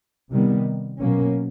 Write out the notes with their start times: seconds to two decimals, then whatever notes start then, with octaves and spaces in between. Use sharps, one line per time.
0.30 C3 D#3 G3 B3
0.98 B2 F#3 A#3 C#4